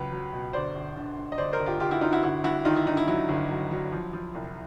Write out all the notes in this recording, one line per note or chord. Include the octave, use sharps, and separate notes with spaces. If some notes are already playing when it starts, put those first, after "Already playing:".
Already playing: C#2 F#3 B4
F#3
B2
G1 C5 D5
G1
D3
G2
D#5
G1 C5 D5
A#4 C5
G1
F4 G4
G1 F4 G4
E4 F#4
D3 D#4 F4
E4 F#4
G1 E4 F#4
G2 E4 F#4
D#3 D#4 F4
E4
G2 D#4
E4
F#3 E4
G1
F#3
F#3
F3
F3
C2